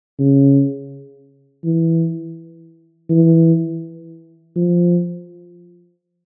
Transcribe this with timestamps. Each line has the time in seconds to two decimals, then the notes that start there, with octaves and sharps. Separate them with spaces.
0.19 C#3
1.64 E3
3.10 E3
4.56 F3